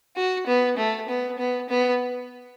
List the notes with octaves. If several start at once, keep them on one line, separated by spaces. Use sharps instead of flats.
F#4
B3
A3
B3
B3
B3